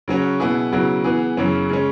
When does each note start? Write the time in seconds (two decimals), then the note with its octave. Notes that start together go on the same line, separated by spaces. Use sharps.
0.08 C#3 F#3 C#4 F#4
0.40 B2 B3 E4 G#4
0.72 C#3 F#3 B3 E4
1.04 E3 B3 G#4
1.37 F#2 C#3 E3 C#4
1.70 C#3 G#3 C#4